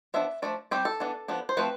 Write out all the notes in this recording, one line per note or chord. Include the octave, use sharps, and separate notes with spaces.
F3 B3 D4 E5
F3 A3 D4 D5
G3 C4 G4
A4
E3 B3 D4
F3 B3 D4
C5
F3 A3 C4 B4